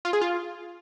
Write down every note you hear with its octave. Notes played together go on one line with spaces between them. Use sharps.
F4
G#4
F4